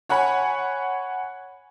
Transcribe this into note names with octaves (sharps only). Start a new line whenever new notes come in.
C#5 F#5 G#5 B5